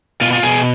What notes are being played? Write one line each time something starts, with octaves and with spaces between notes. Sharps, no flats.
B2 F4
F4
B2 G#4